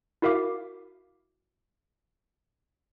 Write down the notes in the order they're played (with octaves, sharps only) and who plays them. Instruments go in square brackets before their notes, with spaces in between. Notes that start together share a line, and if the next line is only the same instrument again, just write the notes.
[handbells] E4 F#4 A#4 E5 F5 D6